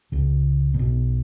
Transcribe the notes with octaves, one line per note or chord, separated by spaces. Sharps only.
C#2 C#3
A#2
B1 B2